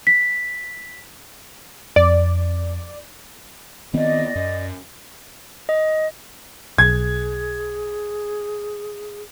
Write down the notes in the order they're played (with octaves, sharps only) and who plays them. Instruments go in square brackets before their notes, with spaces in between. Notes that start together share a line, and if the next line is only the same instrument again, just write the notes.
[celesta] B6
[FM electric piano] F2 [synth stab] D5
[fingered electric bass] D#3 B3 C4 [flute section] D5 D#5
[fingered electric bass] F#2
[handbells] D#5
[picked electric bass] B1 [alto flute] G#4 [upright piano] G#6